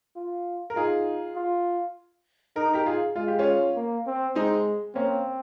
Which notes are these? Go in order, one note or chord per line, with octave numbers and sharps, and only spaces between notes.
F4
A#4
D#4 F4 G#4
F4
D#4 A#4
G4 A#4
F4 G#4
G#3 F4
G4
C#4 F4
A#3
C4
G#3 C4 D#4
A#3 C4 C#4